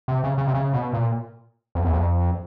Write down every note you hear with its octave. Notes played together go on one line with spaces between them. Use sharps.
C3
C#3
C#3
C3
C#3
B2
A#2
F2
E2
F2